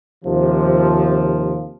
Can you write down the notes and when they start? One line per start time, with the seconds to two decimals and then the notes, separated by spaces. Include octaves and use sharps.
0.25 D#2 C3 F3